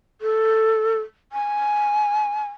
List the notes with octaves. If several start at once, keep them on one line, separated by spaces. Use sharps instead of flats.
A4
G#5